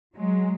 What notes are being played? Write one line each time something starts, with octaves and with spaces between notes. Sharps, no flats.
F#3 G#3